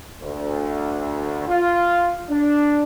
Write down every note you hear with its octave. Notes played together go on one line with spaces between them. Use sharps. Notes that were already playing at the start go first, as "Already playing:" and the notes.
D2
F4
D4